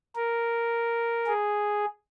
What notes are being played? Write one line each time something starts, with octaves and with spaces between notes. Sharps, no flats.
A#4
G#4